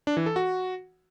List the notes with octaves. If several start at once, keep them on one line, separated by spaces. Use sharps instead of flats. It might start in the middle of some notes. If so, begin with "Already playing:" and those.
D4
E3
A4
F#4